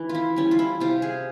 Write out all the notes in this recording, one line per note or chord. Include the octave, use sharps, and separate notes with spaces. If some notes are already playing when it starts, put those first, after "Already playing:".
Already playing: E3
F4
E4
G3 C#4
F4
E4
C3 F4
G#4